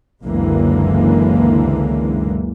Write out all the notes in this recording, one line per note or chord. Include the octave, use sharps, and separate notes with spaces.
F#1 C#2 D3 E3 G#3 A#3